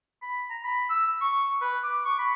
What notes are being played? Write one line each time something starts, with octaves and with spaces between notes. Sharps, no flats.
B5
A#5
B5
E6
C#6
B4
D6
C#6
B5